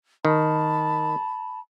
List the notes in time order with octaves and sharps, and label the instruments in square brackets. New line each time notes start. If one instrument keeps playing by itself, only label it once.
[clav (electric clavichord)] D#3 [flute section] A5 B5